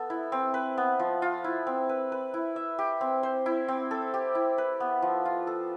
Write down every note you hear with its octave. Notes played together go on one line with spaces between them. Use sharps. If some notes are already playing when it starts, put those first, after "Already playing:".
Already playing: B3 A4
E4
C4
B4
B3
F3
F4
E4
C4
B4
B4
E4
E5
G4
C4
C5
E4
C4
A4
G4
E4
B4
B3
F3
F4
A4